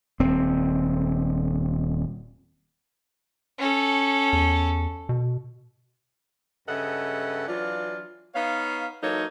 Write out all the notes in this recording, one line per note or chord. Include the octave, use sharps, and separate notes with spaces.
D#1 C4
C#4 A4
E2
B2
G2 C#3 A4 D#5 E5 F#5
E3 F#3 D4 F4
B3 D#4 C#5 F5
E3 F#3 A#3 D#4 A4 C#5